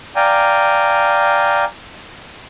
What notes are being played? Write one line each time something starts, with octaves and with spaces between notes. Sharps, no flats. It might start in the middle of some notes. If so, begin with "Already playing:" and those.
D5 F5 G5 G#5 A#5